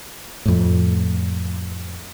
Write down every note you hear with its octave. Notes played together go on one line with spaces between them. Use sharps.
F2 A2